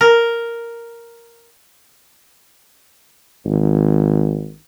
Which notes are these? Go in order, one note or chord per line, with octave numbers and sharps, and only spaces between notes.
A#4
G#1